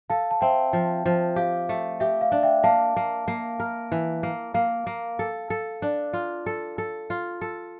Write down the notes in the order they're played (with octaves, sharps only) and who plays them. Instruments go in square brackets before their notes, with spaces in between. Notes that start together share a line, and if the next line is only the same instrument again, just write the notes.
[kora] A4 [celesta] F5 A5
[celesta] A5
[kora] C4 [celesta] E5 G5
[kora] F3
F3
[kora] G4 [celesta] F5
[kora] A3
[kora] G4 [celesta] E5
[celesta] F5
[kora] D4
[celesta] E5 G5
[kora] A#3 [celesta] F5 A5
[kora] A#3
A#3
A#4
E3
A#3
[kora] A#3 [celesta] F5
[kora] A#3
A4
A4
D4
F4
A4
A4
F4
A4